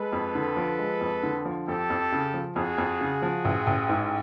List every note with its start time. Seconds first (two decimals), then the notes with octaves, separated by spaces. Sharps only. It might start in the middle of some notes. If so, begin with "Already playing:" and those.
Already playing: G#3 A4 B4
0.13 F2
0.35 D3
0.57 F3
0.79 G#3
1.01 F2
1.23 D3
1.45 F3
1.68 F2 G4 A4
1.90 F2
2.12 C#3
2.34 F3
2.56 F2 F#4 G#4
2.78 F2
3.01 C#3
3.22 F3
3.45 A1
3.67 A1
3.89 G#2